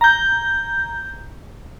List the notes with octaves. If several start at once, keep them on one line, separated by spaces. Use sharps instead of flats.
A#5 G6